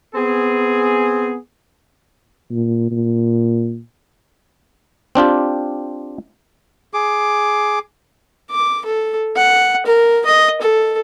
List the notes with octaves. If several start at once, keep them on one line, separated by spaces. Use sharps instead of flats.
B3 C4 G#4
A#2
A#2
C4 D4 F4 G4
G#4 D6
D6
A4
F#5
A#4
D#5
A4